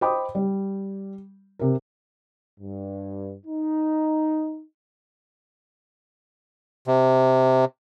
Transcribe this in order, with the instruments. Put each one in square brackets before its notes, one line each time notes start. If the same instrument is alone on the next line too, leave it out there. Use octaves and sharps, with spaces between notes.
[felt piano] C5 D#5 G5 B5 D6 D#6
G3
C3 A#4
[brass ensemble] G2
D#4
[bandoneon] C3